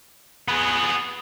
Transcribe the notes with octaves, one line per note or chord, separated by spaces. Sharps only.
B3 G#4